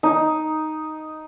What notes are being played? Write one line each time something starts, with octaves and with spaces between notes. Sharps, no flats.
D#4